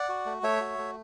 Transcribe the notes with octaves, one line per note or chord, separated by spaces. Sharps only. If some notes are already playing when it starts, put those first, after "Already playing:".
Already playing: D5 F#5
F#4
A3
A3 C#5 E5
F#4
A3